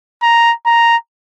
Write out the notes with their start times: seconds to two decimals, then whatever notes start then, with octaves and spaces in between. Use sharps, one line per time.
0.22 A#5
0.66 A#5